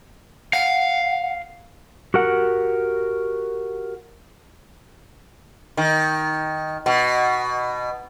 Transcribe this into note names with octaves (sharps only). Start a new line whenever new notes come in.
F5 F#5
F#4 G4 A#4 F#5
D#3
B2